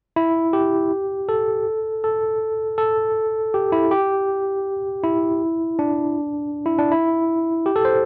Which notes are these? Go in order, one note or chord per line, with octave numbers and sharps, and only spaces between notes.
E4
G4
A4
A4
A4
G4
E4
G4
E4
D4
E4
D4
E4
G4
A4
C5